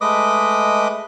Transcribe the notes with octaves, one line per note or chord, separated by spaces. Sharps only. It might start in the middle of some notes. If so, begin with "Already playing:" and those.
G#3 A3 B4 D#5 D6 D#6